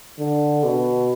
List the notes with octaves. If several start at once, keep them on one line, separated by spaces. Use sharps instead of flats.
D3
B2